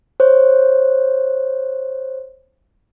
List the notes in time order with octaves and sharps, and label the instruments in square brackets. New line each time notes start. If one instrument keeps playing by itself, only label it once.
[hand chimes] C5 C#5